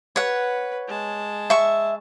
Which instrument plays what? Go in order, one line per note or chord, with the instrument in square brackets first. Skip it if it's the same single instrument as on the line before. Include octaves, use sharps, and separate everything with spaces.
[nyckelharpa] B4 [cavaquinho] C#5 F#5
[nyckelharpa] G#3 A5
[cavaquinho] E5 C#6